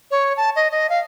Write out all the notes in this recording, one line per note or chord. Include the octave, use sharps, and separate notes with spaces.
C#5
A5
D#5
D#5
F5